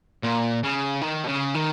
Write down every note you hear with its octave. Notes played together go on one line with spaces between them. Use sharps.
A#2
C#3
D#3
B2
C#3
D#3